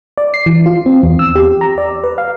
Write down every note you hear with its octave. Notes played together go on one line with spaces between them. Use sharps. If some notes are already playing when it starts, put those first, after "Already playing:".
D5
C7
E3
F4
C4
E2
E6
G4
A#5
D5
B4
F5